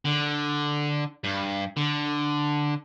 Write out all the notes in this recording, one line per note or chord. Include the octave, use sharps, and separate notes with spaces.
D3
G2
D3